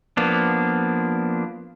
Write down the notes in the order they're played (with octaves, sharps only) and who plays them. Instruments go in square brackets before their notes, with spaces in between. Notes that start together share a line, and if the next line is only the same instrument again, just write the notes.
[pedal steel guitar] F3 A#3 B3 D4